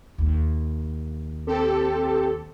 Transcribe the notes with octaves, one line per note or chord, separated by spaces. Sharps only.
D#2
C4 G4 A4